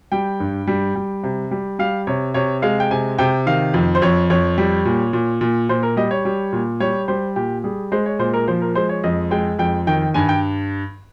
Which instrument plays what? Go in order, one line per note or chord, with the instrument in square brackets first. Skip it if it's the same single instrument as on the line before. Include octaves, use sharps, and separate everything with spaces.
[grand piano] G3 G5
G2
G3
G3
C3
G3
G3 F5
C3 C#5
C3 C#5
G#3 F5
G5
C3 G#5
C3 G5
D#3 F5
F2
C5
F2 C#5
F2 C#5
G3
A#2
A#2
A#2
A#2 C5
A#4
G3 D#5
C#5
G3
A#2
G3 C#5
G3 C5
A#2 G4
G3 G#4
G#3 C5
C#5
A#2 C5
A#4
F3 C5
A#4
G#3 C5
C#5
F2 D#5
G#3 G5
F2 G5
D#3 G5
G2 G#5
G5